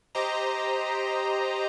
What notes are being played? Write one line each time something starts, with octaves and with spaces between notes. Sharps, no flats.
G4 C5 D#5 A#5